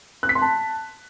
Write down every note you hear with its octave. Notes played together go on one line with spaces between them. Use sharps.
F#6
B6
C6
A5